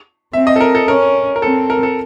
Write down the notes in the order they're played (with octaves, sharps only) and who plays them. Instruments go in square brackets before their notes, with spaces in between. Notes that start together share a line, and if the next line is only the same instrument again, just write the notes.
[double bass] C4 [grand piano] E5
[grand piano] D#5
A4
A#4
A4
[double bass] C#4 [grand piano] A#4
[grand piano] A#4
[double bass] C4 [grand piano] A4
[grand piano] A#4
A4